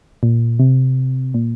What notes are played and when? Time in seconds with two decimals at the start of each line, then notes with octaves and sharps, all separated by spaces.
0.23 A#2
0.59 C3
1.34 A#2